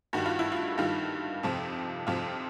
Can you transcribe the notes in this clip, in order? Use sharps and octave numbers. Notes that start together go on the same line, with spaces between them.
G2 D#3 G3 F#4
F4
E4
F4
G2 D#3 G3 F4
F2 C3 F3
F2 C3 F3 F4